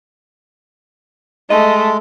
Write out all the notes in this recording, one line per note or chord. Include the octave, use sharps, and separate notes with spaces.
G#3 A3 D#5